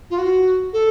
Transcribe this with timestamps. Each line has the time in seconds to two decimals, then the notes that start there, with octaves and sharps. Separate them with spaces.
0.10 F4
0.18 F#4
0.73 A4